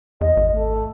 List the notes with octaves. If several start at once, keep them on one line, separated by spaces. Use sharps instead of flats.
E2 D#5
G#1
A3